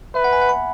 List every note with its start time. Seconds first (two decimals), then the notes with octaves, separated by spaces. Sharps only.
0.15 B4 E5
0.24 F#5
0.33 G#5
0.42 F#5
0.49 B5